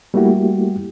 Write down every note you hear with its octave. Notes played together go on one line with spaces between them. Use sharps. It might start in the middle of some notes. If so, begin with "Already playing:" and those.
G3 A3 A#3 E4 F#4 G4